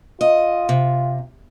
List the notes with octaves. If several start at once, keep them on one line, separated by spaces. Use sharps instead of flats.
F4 D#5
C3